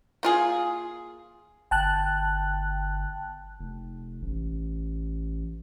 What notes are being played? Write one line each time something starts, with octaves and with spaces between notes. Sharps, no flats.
A#3 F4 G#4
G1 G5 A5 F#6
F1
A1